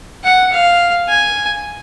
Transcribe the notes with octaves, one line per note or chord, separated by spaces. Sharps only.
F#5
F5
G#5